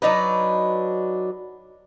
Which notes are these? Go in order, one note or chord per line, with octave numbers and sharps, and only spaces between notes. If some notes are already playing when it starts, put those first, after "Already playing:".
F#3 D4 D#4 B4